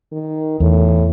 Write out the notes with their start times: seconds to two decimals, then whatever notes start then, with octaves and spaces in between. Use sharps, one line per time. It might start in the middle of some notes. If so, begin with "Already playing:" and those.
0.12 D#3
0.60 E2 A2